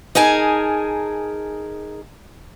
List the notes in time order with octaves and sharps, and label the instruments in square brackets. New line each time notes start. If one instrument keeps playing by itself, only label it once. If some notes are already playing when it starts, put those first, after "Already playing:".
[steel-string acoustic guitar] D#4 G#4 A#4 G#5 A5